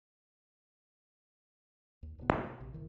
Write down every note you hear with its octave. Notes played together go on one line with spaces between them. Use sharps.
D#2
D1 A2 C3 B3
G2 A#3 B3
B2
A#1 C3
F#1 D#3 E3